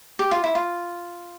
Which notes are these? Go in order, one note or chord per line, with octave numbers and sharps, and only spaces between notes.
G4
F4
E4
F4